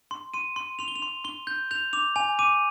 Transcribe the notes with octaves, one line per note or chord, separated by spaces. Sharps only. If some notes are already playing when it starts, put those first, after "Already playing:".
C6
C6 D#7
C6
C6 F7
G7
F7
C6
C6 G7
G6
G6 F7
D6 F7
G#5 F7
D6 D#7